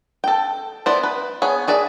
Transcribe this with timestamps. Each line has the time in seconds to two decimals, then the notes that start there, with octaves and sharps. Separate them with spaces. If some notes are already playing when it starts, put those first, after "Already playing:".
0.24 A4 G5
0.86 B3 E4 C5 D5
1.03 B4
1.42 B3 G#4 C#5
1.68 F#4 G#4 D5 E5